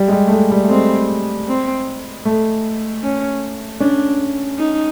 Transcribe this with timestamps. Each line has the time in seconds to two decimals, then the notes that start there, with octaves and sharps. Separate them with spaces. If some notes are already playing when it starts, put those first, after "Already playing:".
Already playing: G3
0.08 G#3
0.12 G3
0.27 A3
0.31 G#3
0.51 G3
0.64 A3
0.70 G#3 C4
1.48 C4
2.25 A3
3.02 C#4
3.80 C#4 D4
4.58 D#4